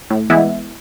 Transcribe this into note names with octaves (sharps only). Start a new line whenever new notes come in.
A2
E3 G#3 B3 E4